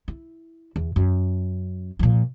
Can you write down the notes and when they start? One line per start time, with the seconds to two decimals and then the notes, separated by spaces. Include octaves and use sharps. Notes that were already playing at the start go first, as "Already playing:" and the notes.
0.08 E4
0.76 E2
0.96 F#2
1.99 A#2 F3